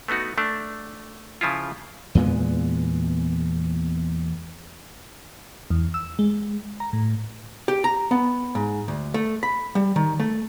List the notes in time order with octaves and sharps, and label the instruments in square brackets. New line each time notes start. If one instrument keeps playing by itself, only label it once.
[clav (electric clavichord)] A3 B3 D#4 F#4
A3 D4
C#3 F3 E4 F4
[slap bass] E2 A#2 G#3 B3
[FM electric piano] E2
E6
G#3
A#5
A2
[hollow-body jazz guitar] G4
A#5
B3
G#2
D2
A3
B5
G3
D#3
A3